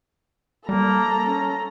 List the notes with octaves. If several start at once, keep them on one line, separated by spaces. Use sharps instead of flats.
G3 A#3 A4 A#5
C#4